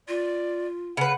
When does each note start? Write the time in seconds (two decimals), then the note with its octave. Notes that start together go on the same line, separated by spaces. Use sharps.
0.08 F4 D5
0.97 C#3 B4 F#5